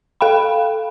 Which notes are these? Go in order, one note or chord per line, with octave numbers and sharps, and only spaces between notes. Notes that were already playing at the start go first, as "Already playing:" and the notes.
A4 F5 G5 B5